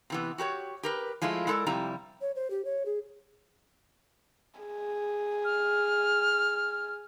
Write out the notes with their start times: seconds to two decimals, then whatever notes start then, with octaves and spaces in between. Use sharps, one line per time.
0.10 C3 E3 B3
0.38 F#4 G4 A#4 C#5
0.83 G4 A#4 B4
1.22 F3 G#3 A3 E4 F4
1.47 G#3 E4 A4 A#4 D5
1.66 F2 C3 G3 E4 A#5
2.21 C#5
2.36 C5
2.51 G4
2.65 C#5
2.86 G#4
4.59 G#4
5.45 F6